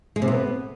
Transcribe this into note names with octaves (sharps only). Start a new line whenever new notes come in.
G#3
C3
B3